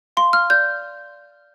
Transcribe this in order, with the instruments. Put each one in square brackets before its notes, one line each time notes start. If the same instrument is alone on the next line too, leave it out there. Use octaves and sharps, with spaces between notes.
[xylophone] F5 C6
F5 F6
D5 G6